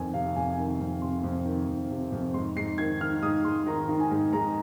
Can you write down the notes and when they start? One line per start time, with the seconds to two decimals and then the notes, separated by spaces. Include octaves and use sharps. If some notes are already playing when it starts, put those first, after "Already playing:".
Already playing: F2 D#3 G#5
0.13 C3 F5
0.36 F2 G#5
0.52 G#5
0.58 D#3
0.69 G#5
0.80 F2
1.02 C3 C6
1.24 F2
1.45 D#3
1.68 F2
1.90 C3
2.12 F2
2.34 G#2 C6
2.56 G#2 C7
2.78 D#3 G#6
3.01 D#3 F6
3.22 G#2 D#6
3.44 G#2 C6
3.67 D#3 A#5
3.89 D#3
4.00 G#5
4.11 G#2
4.33 G#2 A#5